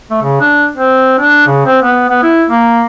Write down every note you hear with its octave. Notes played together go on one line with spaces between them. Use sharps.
A3
C#3
D4
C4
D4
C#3
C4
B3
B3
E4
A#3